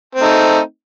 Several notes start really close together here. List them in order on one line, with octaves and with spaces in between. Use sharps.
C4 A3 D#4